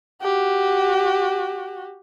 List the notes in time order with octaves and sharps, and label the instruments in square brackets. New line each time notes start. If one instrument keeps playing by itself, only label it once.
[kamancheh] F#4 G4